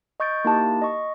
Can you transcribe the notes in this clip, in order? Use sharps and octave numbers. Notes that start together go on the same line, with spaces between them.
D#5 C#6 G6 A6 D7
A#3 D#4 E4 G4 A5
D#5 C#6